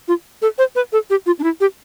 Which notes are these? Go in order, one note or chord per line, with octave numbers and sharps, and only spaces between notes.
F4
A4
C5
B4
A4
G4
F4
D4
E4
G4